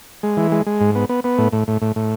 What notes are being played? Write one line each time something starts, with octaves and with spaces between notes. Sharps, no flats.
G#3
E3
G#3
G#3
G#2
B3
B3
B3
A2
A2
A2
A2
A2